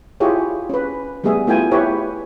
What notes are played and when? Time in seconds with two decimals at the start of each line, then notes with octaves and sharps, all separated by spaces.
0.20 E4 F4 G4 G#4 C#5
0.70 C#4 B4
1.24 G3 A3 B3 G#4 E5
1.47 A3 B3 E4 F4 G5 G#5
1.71 E4 G4 B4 C#5